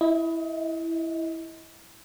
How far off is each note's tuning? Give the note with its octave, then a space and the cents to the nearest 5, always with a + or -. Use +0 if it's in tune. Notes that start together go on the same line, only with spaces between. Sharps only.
E4 +0 D#5 +30